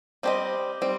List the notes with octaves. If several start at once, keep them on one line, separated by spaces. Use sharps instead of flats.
G3 C4 G4 C5 D#5
G3 C4